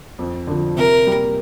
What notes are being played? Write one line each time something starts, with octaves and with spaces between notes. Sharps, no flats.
F2
D3 F3
C3 A#4
G3 A#3